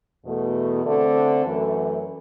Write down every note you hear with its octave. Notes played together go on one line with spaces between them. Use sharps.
E2 B2 A3
D3 A3 C4
F#2 E3 A3